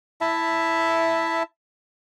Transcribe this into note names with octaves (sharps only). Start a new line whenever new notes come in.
E4 E5 A5